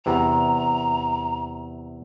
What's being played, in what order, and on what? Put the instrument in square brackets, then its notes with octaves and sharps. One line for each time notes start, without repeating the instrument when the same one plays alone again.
[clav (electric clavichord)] E2 C3 [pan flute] A#5